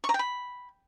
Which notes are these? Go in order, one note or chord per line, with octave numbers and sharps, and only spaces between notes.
C#6
A#5
G5
B5